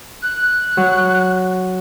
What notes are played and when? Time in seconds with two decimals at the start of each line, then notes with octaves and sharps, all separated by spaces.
0.22 F#6
0.77 F#3